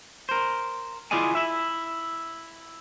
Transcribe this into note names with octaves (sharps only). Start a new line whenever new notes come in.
A#4 C5
E4 F4 G#4 D5 D#5 G#5
E4 E5